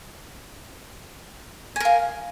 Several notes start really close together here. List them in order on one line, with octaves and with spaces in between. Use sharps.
G#5 A#4 F5